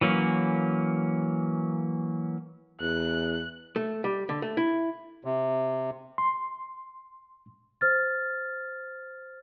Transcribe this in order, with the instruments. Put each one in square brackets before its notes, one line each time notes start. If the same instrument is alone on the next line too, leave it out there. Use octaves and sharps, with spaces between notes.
[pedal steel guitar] E3 F#3 A#3 C#4
[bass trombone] E2 [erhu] F#6
[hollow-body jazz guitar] A3
G3
D3
A3
E4
[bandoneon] C3
[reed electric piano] C6
[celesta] C5 F6 A6